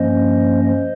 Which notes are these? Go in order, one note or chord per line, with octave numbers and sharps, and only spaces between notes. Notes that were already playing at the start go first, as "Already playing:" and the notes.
Already playing: G2 F3 A#3 C#4 C5 D#5
C5 D#5